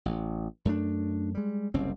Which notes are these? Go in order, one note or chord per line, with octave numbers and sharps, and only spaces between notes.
A1
F#2 A3 D4
G3 G#3
F#1 C2 C4 C#4